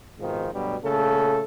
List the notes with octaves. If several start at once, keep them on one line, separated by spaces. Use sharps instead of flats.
F2 G#2 B2 D#3 F3
D2 G2 B2 F#3 G3
A#2 C#3 A3 A4